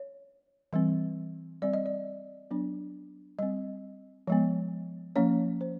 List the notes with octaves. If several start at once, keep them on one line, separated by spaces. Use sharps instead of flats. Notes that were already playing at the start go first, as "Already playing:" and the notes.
Already playing: C#5
E3 G3 C4
G3 C4 D5
D#5
D5
F#3 B3 D4
G3 C4 D#5
F3 G#3 B3
F3 A#3 C#4 C#5
C5